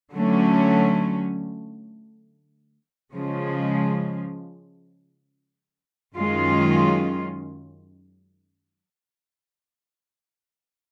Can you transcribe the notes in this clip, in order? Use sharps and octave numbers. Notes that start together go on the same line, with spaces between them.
D3 F#3 A3 C#4
C#3 F3 G#3
F#2 D#3 G#3 C#4 F4